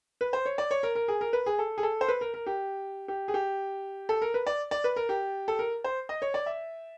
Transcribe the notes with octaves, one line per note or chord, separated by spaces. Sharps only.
B4
C5
C#5
D5
C#5
A#4
A#4
G#4
A#4
B4
G#4
A4
G#4
A4
C5
B4
A#4
A#4
G4
G4
G#4
G4
A4
A#4
B4
D5
D5
B4
A#4
G4
A4
A#4
C5
D#5
C#5
D5
E5